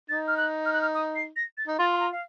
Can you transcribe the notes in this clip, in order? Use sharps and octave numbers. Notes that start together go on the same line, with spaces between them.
D#4 A6
F6
F#6
F6
F#6
F6
D#6
C7
A#6
A6
D#4
F4 A6
C6
A#5
F5